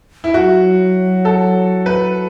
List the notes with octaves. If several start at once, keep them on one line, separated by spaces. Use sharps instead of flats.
E4
F#3 F#4
A4
B4